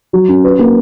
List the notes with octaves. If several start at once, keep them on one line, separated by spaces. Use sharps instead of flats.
F#3
C#4
B4
A#3